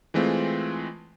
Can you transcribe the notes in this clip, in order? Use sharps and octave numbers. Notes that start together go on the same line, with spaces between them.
E3 G#3 A3 C4 F4